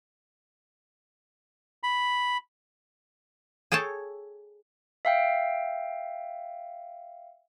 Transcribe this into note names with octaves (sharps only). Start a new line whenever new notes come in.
B5
G#4 A4 C#5 G5 A5
E5 F5 G5